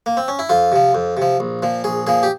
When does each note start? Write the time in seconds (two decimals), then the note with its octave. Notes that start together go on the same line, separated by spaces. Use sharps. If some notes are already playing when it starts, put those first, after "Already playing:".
0.06 A#3
0.17 C4
0.28 C#4
0.39 E4
0.49 F2 F4
0.72 C3 F3
0.95 F2
1.17 C3 F3
1.40 A#1
1.62 A#2 F3
1.84 A#1 G#4
2.07 A#2 F3 G#4
2.23 G4